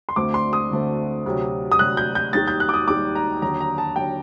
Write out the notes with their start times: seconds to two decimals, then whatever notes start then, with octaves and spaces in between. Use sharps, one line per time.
0.09 C6
0.16 D2 D3 A3 C4 D6
0.34 C6
0.53 D#6
0.71 D2 D3 A3 C4
1.26 D2 C3 F#3
1.72 D#6
1.79 D2 C3 F#3 F#6
1.97 G6
2.15 G6
2.33 D#2 D#3 G3 A6
2.48 G6
2.60 F#6
2.69 D6
2.74 D#6
2.88 D#2 D#3 G3 D6
3.15 A#5
3.42 D#2 D3 F#3 A#5
3.60 A#5
3.78 A5
3.96 D#2 D3 F#3 G5